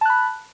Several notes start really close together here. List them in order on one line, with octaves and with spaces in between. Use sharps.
A5 F#6 B5